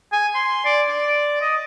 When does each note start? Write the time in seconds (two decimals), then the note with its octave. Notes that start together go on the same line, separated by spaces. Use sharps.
0.13 G#5
0.35 C6
0.65 D5
0.89 D5
1.41 D#5